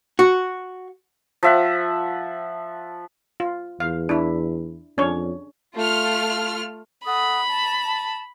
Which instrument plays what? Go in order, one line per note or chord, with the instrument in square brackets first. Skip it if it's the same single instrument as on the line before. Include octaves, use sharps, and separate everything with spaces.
[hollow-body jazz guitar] F#4
[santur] F3 E5 F#5
[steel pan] F4
[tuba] E2 [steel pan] F5
[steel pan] D4 E4
[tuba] F2 [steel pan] C#4 D4 C#5
[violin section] A3 F4 F6
[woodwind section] A4 F#5 D#6 [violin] B5
[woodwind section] A5